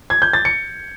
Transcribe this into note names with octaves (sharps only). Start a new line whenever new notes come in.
G#6
G6
A6
C#7